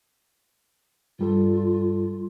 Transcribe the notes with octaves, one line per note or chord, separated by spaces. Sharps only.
G2 G3 F4 A4